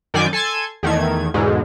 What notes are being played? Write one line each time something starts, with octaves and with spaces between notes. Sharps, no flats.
F#2 D#3 D5 G#5 D6 G6
A4 G#5 A5 C6 G#6
E2 D#3 A3 G#6
E2 G#2 B2 D3 G#3